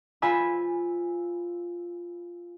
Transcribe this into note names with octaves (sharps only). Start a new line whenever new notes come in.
F4 C5 G#5 B5 E6